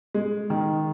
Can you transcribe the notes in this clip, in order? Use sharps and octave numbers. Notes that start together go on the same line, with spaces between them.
G#3
D#3